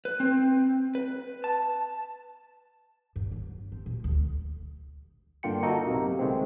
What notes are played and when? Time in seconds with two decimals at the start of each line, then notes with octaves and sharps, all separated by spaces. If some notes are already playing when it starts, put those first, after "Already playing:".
0.05 B4
0.20 C4
0.95 B4
1.44 A5
3.16 G2
3.32 F#3
3.72 C4
3.86 B2
4.04 D2
5.43 G2 D3 A#3 F4 G5 C#7
5.62 A#3 D#4 F#4 A4
5.86 B1 C3
6.19 D3 D#3 G#3 A3 C4